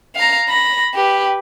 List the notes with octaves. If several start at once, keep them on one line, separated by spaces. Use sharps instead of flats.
F5 A#5
B5 A#6
G4 B4